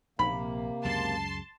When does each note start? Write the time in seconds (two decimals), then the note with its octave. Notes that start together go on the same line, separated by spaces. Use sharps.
0.19 A#1 C3 A#3 B5
0.85 C#2 F#2 G#3 A5 C6